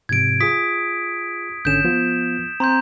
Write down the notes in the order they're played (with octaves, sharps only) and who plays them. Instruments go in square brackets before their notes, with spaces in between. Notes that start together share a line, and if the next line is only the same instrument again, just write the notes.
[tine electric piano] G#2 C3 F3 [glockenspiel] G#6 D7
[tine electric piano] F4 G#4 [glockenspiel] D#6 B6
[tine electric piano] G#1 D3 C#4 [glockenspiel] G6 E7
[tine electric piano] F3 B3 F4
[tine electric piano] C4 [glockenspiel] A#5 C6 G6